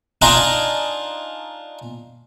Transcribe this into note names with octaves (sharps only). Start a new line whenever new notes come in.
D4 D#4 F4 G#5 A#5